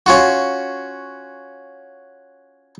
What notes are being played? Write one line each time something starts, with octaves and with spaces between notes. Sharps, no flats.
C#4 F4 F#4